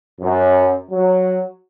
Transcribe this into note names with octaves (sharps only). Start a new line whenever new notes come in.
F#2
F#3